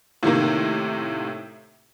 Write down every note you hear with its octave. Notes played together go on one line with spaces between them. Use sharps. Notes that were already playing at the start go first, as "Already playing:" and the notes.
A2 C3 D#3 A#3